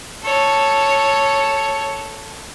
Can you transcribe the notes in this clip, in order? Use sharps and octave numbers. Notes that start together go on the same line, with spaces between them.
A4 C#5